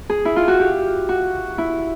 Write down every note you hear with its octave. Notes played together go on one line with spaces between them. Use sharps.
G#4
E4
F4
F#4
G4
F#4
E4